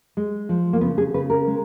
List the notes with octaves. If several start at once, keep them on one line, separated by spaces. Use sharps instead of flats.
G#3
F3
A#3
C#3 B3
G#4
C#3 B4
A#4
G#3